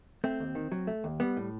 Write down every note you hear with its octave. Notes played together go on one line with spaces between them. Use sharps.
A3 C4
D#2
D#3
F#3
A3
D#2
G3 B3
A2